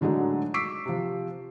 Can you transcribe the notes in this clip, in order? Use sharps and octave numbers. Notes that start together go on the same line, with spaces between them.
A2 D3 F#3 G#3 D#4
C#6 D6 E6 B6 C7 D7
C3 F3